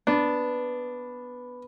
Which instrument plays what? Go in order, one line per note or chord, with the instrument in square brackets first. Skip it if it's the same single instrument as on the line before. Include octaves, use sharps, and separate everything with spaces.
[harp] B3 [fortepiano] D4